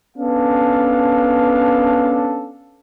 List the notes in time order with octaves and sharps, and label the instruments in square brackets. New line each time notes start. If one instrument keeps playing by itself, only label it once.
[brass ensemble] B3 C#4 D4 A4 F5